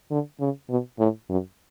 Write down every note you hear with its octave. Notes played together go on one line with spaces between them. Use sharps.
D3
C#3
B2
A2
F#2